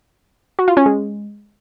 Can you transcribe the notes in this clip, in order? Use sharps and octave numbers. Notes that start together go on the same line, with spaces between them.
F#4
F4
C#4
G#3